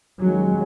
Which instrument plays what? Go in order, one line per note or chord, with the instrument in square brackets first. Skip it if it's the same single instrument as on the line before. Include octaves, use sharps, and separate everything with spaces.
[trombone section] D#2 D#3 G#3 C#4 [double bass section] F#3